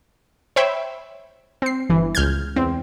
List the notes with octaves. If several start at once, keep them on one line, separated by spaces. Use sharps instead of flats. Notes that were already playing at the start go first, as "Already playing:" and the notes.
C5 C#5 E5 G5 B5
C4 C7
G1 E3
C#2 F6 G6 G#6
E2 C4